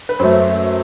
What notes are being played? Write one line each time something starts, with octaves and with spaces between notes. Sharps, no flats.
B4
F#2 F#3 A3 C5